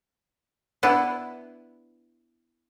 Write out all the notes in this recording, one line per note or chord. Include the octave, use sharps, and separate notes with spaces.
B3 D4 E4